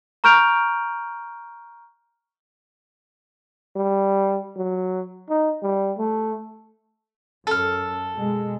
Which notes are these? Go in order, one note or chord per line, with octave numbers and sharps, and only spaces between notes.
A#5 C#6 F6 G6 D7 F7
G3
F#3
D#4
G3
A3
F#2 A4 F6
B2 G#3